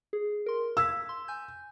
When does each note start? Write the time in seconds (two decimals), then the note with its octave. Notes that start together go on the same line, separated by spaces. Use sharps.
0.13 G#4
0.46 A#4 C6
0.77 F5 E6 G#6 B6
1.09 C6
1.28 G#5 G6